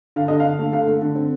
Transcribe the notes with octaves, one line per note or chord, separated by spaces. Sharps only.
D3 F5
D3 D#5
D3 F5
A3
D3 F5
A3
D3
C4